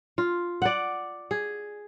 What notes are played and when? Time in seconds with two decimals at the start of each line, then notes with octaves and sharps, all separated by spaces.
0.18 F4
0.62 D5 F#5
1.31 G#4